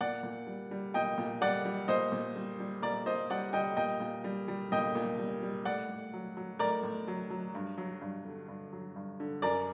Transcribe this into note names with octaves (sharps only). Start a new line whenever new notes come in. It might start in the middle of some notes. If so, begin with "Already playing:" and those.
A#2 D5 F#5
A#2
G3
G3
A#2 D#5 G5
A#2
G3 D5 F#5
G3
A#2 C5 D#5
A#2
G3
G3
A#2 A#4 D5
A#2 C5 D#5
G3 D5 F#5
G3 D#5 G5
A#2 D#5 G5
A#2
G3
G3
A#2 D#5 G5
A#2
G3
G3
A2 D5 F#5
A2
F#3
F#3
A2 A#4 D5
A2
F#3
F#3
G2
F#3
G2
D3
G2
F#3
G2
D3
F#2 A#4 D5